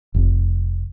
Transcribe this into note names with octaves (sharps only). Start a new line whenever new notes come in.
F1